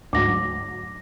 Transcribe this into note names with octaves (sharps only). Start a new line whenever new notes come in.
D2 G#2 F#3 D6 A#6